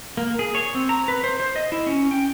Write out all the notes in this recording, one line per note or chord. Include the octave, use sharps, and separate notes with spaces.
A#3
G#4
C#5
C4
A#5
B4
C5
C5
D#5
E4
C#4
G5